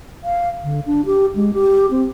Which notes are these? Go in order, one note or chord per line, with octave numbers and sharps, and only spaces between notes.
F5
D3
D4
G4
G#3
G4
C4